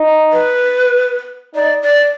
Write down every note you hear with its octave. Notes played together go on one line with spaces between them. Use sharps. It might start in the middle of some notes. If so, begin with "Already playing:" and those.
Already playing: D#4
B4
D#4 D5
D5